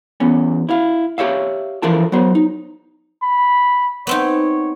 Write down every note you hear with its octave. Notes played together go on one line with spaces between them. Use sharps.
E2 B3 C#4
E4 F5
G4 C#5 E5 F5
E3 F3 F4 A4 A#4 A5
F#3 B3 C5
D#4
B5
B3 C4 D#4 C#5